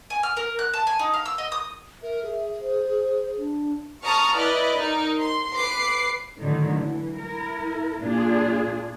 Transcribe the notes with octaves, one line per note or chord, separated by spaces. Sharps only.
G#5
F6
A#4
F#6
A5
G#5
D#4
F5
E6
D#5
D#6
A#4 E5
G#4
C5
D4
A5 A#5 C#6 D#6 F6
E4 B4 D5 D#5
D#4 A#4
C6
B4 D6 C7
A2 D3 D#3 F#3 A3
E3
E4 A#4
A#2 D4 F4 G#4